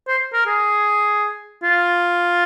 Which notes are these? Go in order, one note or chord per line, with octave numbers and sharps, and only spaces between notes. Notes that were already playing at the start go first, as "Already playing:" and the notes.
C5
A#4
G#4
F4